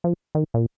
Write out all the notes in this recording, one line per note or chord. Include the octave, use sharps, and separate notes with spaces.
F3
D#3
A#2